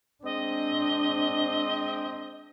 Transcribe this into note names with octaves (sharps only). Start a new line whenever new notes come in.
G#3 C4 D4 D#5